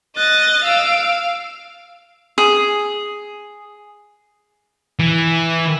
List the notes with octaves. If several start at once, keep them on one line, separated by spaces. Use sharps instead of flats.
D#5 F#6 A6
F5 E6 D7
G#4
E3